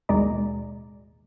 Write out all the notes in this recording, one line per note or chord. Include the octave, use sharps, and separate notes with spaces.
A1 D#2 B2 G#3 D5 A#5